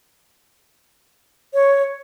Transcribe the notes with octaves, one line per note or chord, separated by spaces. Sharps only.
C#5